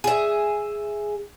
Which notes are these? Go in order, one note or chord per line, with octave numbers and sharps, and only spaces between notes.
G#4 E5